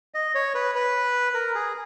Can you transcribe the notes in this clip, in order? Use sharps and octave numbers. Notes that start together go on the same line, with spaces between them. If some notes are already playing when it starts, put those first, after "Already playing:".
D#5
C#5
B4
B4
A#4
G#4